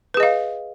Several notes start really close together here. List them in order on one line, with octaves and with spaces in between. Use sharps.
B4 G#4 D#5 F5